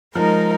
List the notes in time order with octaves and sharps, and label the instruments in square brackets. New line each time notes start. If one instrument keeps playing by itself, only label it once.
[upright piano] F3 [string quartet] G#3 D#4 A#4